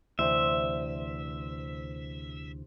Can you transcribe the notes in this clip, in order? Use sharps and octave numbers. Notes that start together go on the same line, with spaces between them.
D2 C3 E3 C5 E5